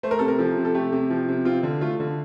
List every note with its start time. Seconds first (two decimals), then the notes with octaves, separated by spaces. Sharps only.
0.03 A3 C5
0.11 A#4
0.19 C3 A4
0.28 A#4
0.39 F3 A4
0.57 C3
0.65 A4
0.75 A3 G4
0.92 C3
1.10 F3
1.29 C3
1.45 C4 F4
1.63 D3
1.81 A3 F4
2.00 D3